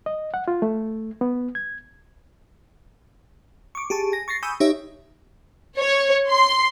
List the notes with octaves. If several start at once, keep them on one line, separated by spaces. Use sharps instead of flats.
D#5
F#5
F4
A3
B3
G#6
C#6 D6
G4 G#4 A5 C#6
G#5 A#6
C#6 A6 A#6 C7
G#5 B5 C#6 D#6 E6 G6
D#4 G4 C#5 D#5 E5
C#5
C6